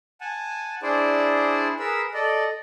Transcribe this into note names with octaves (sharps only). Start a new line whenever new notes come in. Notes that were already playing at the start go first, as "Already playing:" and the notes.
F#5 G#5 A5
D4 E4 G#4 C5 D5
G#4 A#4 B4 E6
A4 D5 D#5